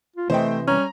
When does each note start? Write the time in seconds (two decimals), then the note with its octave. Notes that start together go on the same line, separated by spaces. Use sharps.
0.16 F4
0.30 C3 E3 A3 C5 D#5 G5
0.68 G3 C#4 A#5